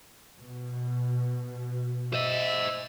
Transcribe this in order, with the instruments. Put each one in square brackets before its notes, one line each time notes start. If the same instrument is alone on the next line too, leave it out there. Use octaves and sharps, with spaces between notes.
[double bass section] B2
[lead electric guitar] C5 D#5 [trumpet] E5